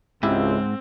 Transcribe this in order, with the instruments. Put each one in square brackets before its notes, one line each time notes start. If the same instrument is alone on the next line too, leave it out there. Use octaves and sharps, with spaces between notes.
[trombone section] C#2 [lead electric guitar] G#2 [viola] C4 [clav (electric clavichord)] E4 G4